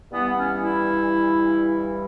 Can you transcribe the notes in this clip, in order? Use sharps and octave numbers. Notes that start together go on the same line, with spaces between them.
G2 E3 G3 B3
C#4
E4